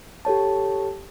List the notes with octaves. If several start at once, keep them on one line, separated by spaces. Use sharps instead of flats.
G4 A4 C#5 A5